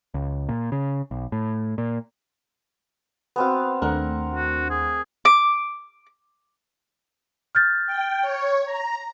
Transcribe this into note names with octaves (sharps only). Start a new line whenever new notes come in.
C#2
A#2
C#3
B1
A2
A#2
B3 C4 F#4 B4 F5
D#2 A3 D4 A#4 F#5
F#4
G#4
D6
F6 G6 A6
G5
C#5
A#5